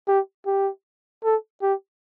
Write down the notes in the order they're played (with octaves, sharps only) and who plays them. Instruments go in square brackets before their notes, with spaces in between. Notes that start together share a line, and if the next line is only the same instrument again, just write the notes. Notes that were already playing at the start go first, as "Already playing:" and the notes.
[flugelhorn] G4
G4
A4
G4